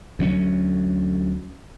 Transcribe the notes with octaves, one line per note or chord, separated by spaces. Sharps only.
D2 F#3 B3 C#4